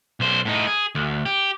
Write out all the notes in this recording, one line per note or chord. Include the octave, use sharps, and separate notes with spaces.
B1 C5
A2 D#4
G#4
D2
G4